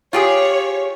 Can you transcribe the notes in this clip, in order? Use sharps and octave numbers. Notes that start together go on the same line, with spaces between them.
F4 G4 G#4 C#5